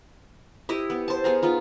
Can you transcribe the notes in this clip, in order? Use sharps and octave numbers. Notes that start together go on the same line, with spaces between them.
E4 G4 D#5
B3
C5 A5
B3 G#4 A#4
B3 D#4 F4